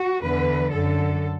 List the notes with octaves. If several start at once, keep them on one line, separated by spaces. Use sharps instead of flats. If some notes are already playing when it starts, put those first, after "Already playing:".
Already playing: F#4
E2 D3 B4
F#2 D3 A4